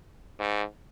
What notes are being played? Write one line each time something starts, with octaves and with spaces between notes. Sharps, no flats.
G#2